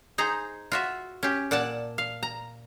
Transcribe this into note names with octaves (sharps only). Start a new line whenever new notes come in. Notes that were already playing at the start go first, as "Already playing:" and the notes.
D#4 G#4 C5 A#5
F4 F#4 E5
C#4 G4
A#2 D5 F#5 A5
F5
A#5